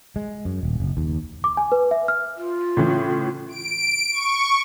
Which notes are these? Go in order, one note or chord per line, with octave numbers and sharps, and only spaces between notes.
G#3
F#2
D#1
F#1
D#2
D6
G#5
B4
E5
F6
F4
A2 C#3 E3
D7
C#6